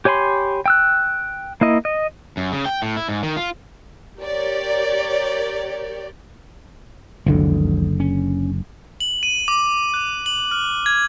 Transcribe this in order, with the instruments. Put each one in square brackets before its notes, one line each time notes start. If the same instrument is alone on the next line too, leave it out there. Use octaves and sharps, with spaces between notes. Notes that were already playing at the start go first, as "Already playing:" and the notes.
[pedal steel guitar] G4 C#5 G#5 B5 C6
G5 E6 F#6
A#3 E4 D#5
D#5
[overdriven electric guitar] F#2
C#3
G5
A2
E4
G#2
D#3
F4
[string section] G4 A#4 C#5 D5
[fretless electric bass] F#1 D3 [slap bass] C#2 D#3 F3
[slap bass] C#4
[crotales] F#7
D#7
D6
F#6
F#7
F6
G#6